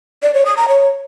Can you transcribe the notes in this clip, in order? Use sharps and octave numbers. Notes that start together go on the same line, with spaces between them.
D5
C#5
D#6
A#5
C#5